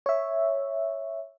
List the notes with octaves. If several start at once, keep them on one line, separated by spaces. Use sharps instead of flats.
C#5 E5